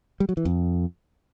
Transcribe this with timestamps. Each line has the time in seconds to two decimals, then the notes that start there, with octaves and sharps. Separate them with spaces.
0.20 G3
0.29 F#3
0.37 E3
0.45 F2